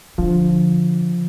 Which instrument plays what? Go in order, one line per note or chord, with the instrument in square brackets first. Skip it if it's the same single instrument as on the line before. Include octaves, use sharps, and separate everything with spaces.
[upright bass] D3 [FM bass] F3